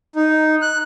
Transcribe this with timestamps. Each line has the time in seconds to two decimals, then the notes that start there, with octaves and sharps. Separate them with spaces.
0.16 D#4
0.62 F#6